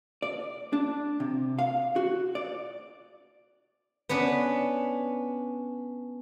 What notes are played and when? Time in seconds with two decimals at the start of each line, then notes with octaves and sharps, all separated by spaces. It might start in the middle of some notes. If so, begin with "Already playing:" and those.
0.22 D5
0.73 D4
1.20 C3
1.59 F5
1.96 F#4
2.35 D5
4.09 B3 C#4 D4 B4